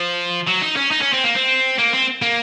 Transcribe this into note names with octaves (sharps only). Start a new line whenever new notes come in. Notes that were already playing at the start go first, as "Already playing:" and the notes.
Already playing: F3
F#3
D#4
C#4
D#4
C#4
C4
A#3
C4
A#3
C4
A#3